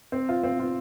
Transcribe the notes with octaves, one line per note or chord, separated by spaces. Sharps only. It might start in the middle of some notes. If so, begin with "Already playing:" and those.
C4
F4
C4
F4